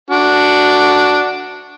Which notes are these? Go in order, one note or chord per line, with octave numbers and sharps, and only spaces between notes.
D4 F#4